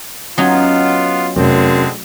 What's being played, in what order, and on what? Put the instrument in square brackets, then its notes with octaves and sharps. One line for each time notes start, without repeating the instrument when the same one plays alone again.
[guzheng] F#3 C#4 D#4 [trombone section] B3 F4
[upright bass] F1 [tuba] F#2 [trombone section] D3 G#3 C4